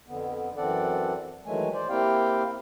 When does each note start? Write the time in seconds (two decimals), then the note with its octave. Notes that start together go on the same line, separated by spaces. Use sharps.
0.08 F2 D3 B3
0.57 F#2 E3 C4 A4 D5 F#5
1.46 D#3 E3 F#3 G#3 A3 G#5
1.73 C5 D5
1.89 A#3 C4 E4 G4 F5 G5